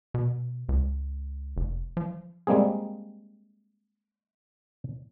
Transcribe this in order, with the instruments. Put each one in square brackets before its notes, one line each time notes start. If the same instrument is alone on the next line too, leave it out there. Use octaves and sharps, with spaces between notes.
[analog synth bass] B2
C#2
F1
F3
[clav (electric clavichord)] G3 G#3 A#3 C4 G#4